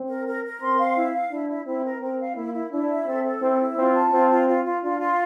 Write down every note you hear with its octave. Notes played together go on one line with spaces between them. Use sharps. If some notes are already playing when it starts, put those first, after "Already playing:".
Already playing: C4
A#4
A#4
A#4
C4 C6
F5
E4
F5
D4 E4
E4
C4 E4
A#4
C4 A#4
F5
A#3 E4
E4
D4 E4
E5
C4 A4
A4
C4 E4
E4
C4 F4
A5
C4 F4
F4
F4
F4
D4 F4
F4